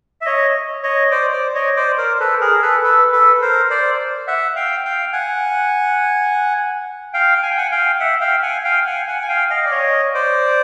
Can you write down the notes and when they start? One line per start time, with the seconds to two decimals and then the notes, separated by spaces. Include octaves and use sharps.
0.21 E5
0.26 C#5 D#5
0.83 C#5 D#5
1.11 C5 D5
1.33 C5 D5
1.54 C#5 D#5
1.77 C5 D5
1.98 A#4 C5
2.20 A4 B4
2.41 G#4 A#4
2.62 A4 B4
2.83 A4 B4
3.12 A4 B4
3.42 A#4 C5
3.70 C5 D5
4.27 E5 F#5
4.56 F5 G5
4.85 F5 G5
5.13 F#5 G#5
7.13 F5 G5
7.43 G#5
7.51 G5
7.57 F#5 G#5
7.71 F5 G5
7.99 E5 F#5
8.21 F5 G5
8.42 F#5 G#5
8.64 F5 G5
8.87 F#5 G#5
9.07 F#5 G#5
9.22 G#5
9.28 F5 G5
9.50 D#5 F5
9.66 D5
9.71 C#5 D#5
10.14 C5 D5